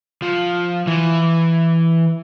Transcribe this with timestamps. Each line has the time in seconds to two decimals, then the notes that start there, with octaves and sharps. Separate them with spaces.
0.22 F3
0.87 E3